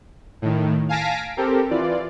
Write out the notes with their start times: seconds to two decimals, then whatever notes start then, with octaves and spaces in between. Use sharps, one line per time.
0.42 A2 D#3
0.89 F5 G#5 A5 A#6 B6 D7
1.37 C4 G4 A4 A#4
1.71 E3 F4 D5